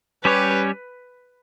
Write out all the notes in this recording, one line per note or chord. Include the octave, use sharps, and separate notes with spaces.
G3 C#4 G4 B4 C#5